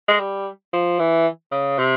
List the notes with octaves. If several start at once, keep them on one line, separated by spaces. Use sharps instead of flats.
G#3
G3
F3
E3
C#3
C3